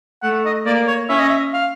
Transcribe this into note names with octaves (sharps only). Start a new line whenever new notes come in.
A3 F#5
D#5
A#3 D5
C#5
C#4 E5
D#5
E5
F5